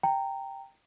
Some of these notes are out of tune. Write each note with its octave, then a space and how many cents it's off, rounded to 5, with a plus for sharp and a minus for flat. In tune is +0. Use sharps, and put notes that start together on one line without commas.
G5 +0 A#5 -20